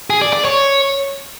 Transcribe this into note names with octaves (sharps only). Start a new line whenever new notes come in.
G#4
D5
D5
C#5